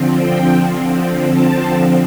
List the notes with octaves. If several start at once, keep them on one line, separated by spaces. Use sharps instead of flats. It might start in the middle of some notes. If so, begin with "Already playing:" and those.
Already playing: D3 F3 C4
G5
A5